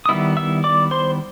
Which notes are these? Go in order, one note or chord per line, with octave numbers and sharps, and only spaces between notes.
D#6
D#3 G3 B3 E4 E5 E6
E5 E6
D5 D6
C5 C6